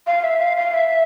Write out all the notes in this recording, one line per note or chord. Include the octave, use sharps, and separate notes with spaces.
F5
E5
F5
F5
E5